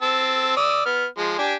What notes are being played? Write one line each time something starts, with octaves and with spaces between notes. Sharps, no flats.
C4 A5 E6
D5 D#6 E6
B3 F6
F3 G#3
D4 G4 G#5